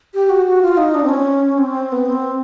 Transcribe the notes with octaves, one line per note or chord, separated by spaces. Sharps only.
G4
F#4
F#4
F4
D#4
D4
C4
C#4
C4
B3
C4